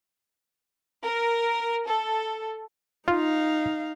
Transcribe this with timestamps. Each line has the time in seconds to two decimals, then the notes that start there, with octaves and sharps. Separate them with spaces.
1.04 A#4
1.86 A4
3.08 D#4 F4 F5